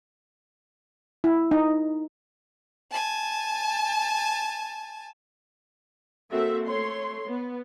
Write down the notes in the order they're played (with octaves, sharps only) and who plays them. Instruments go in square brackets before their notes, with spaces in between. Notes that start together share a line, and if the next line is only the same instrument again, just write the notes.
[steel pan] E4
D#4
[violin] G#5 A5
[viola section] A#3 C4 F#4 A4 E5
A3 C#5 C6
B3